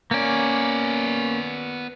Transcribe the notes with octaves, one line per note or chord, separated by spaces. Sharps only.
A#3 B3 C#4 D5